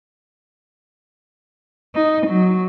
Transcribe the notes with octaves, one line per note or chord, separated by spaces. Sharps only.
D#4
F#3